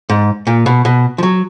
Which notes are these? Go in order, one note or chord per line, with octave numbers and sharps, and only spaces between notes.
G#2
A#2
B2
B2
F3
F#3